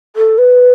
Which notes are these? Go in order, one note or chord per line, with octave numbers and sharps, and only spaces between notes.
A4
B4